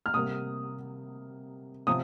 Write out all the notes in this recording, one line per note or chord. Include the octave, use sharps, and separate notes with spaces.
F6
C3 G3 A#3 D#6
C3 F3 D#6